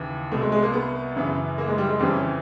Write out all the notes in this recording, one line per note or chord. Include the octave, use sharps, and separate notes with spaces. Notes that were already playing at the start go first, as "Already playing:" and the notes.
Already playing: D#2 C#3 E3
C2 B2 A3
G#3
G#3
A#3
B3
F#2 C#3 E3
A#3
G#3
G3
G#3
F2 C#3 E3 G3
C#4